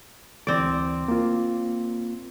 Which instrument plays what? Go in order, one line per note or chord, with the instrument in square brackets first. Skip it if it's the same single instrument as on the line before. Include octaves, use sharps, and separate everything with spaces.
[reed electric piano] D2 E3 D6 [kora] C4 D5
[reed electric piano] A#3 F4